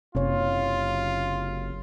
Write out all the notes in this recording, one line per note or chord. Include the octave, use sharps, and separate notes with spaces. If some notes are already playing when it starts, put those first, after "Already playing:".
F#1 C3 F4 C#5